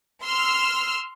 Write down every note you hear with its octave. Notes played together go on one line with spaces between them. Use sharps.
C6 E6 F6